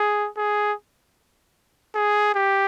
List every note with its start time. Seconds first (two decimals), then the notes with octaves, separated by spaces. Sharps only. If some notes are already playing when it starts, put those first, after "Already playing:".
Already playing: G#4
0.37 G#4
1.95 G#4
2.35 G4